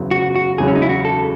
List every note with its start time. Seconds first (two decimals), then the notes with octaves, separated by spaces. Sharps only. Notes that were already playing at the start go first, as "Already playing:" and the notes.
Already playing: F#1 E2 C#3 F#3 B3
0.11 F#4
0.36 F#4
0.58 E1 E2 C#3 F#3 G#4
0.68 C#4
0.75 D#4
0.82 E4
0.89 F#4
1.05 A4